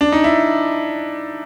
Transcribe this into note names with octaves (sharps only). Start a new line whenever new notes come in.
D4
D#4
E4